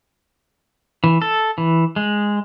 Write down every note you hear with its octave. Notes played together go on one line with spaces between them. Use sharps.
E3
A4
E3
G#3